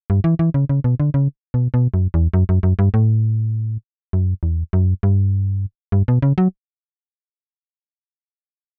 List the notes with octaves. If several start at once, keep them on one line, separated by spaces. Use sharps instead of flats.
G2
E3
E3
C#3
C#3
B2
D3
C#3
B2
B2
F#2
E2
F#2
F#2
F#2
G2
A2
F#2
E2
F#2
G2
G2
B2
C#3
F#3